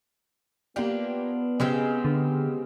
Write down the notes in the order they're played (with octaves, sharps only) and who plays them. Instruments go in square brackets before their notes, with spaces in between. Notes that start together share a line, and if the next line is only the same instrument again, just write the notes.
[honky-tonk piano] A#3 G4 [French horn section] B3 [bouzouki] D4 F4
[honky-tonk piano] C#3 [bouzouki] G#3 C4 G4
[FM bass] D3